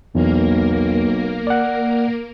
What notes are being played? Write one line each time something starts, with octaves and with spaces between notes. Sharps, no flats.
B1 E2 A#3 A#4
D5 F#5